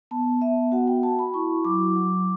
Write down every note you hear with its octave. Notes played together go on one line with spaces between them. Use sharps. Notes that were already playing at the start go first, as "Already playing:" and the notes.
B3 A5
B3 E5
F#4 F#5
G5
F#4 A5
B5
E4 C#6
F#3 D6
F#3